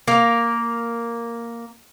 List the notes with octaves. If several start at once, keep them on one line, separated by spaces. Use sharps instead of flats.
A#3 A#4